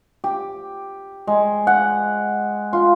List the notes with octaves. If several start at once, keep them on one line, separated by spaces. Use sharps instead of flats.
G4
G#3
F#5
F4